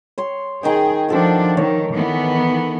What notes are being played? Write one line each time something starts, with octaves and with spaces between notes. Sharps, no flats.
C#5 C6
D#3 G#4 D#5 G5
F3 D4 F#4 A4 C5
D#3 C#5
D#3 E3 B3